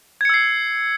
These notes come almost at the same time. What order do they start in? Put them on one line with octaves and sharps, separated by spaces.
G#6 C#7 E6 C7